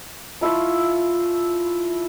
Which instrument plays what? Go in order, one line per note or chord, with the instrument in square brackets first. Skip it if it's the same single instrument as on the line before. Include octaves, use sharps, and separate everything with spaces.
[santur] F3 E4 F4 C#6